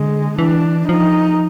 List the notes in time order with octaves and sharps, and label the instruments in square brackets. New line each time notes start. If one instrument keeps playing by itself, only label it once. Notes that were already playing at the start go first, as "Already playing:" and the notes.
Already playing: [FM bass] D3 [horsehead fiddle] G#3
[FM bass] E3 [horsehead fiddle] D4
[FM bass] F3 [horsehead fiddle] D#4